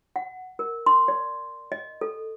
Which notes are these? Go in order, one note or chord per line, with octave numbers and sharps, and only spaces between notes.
F#5
A#4
C6
D5
D#5
A4